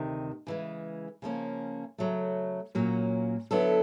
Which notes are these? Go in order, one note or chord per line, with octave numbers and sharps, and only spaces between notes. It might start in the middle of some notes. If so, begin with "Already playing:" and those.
Already playing: D2 C3 D#3
C#3 E3 G#3
C#3 F3 A#3 C#4
C#3 F#3 A3
A#2 F#3 A#3 C#4
D3 F#3 B3 E4 A4